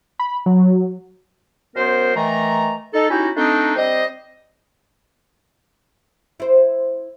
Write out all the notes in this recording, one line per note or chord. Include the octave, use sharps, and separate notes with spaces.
B5
F#3
F#2 B3 A#4 C5
D#3 E3 A3 A#5
D#4 A4
C#4 D#4 E4 F#4 G4
A3 C4 D4 D#4
G3 C4 C5 D#5
E4 C5